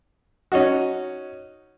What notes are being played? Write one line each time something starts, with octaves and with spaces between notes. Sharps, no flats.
C#4 D#4 F#4